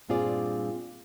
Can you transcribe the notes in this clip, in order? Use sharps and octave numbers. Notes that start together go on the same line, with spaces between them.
G2 A#2 C4 F4 G#4 D5